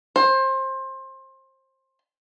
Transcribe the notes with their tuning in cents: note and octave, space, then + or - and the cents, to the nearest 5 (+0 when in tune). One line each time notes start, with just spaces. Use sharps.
C5 +25